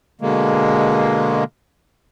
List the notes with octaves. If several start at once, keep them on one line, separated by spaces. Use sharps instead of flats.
B2 D3 G#3 A#3